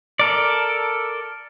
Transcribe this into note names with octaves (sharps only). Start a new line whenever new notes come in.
A4 A#4 D5